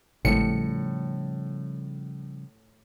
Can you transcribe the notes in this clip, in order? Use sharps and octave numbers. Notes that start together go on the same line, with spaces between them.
G#1 A2 C#3 F3 G3 C#7